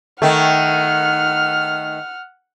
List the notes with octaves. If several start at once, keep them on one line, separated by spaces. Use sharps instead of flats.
D#3 A3 F#5 F6